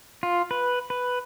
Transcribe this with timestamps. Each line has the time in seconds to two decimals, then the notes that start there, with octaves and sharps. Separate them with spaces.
0.23 F4
0.51 B4
0.90 B4